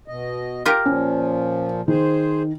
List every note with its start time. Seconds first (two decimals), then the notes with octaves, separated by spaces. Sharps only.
0.08 B2 D#5
0.65 F4 G4 A#4
0.86 A#2 F3 C#4
1.88 D#3 G#4 C5